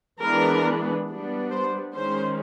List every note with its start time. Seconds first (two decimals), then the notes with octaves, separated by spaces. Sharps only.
0.22 E3 G#3 B3 D4 A#4
1.08 G3 B3 D4
1.51 C5
1.94 D#3 G#3 C#4 C5